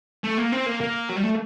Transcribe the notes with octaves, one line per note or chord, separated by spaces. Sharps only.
A3
A#3
C4
A#3
A#3
F#3
G3
A3